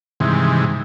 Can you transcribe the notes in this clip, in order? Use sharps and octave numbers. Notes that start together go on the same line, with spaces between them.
G2 C3 D#3 E3 G#3